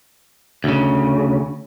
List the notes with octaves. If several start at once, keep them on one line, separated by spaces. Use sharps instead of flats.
D2 C#3